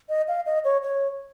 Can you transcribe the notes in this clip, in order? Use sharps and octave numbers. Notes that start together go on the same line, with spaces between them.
D#5
F5
D#5
C#5
C#5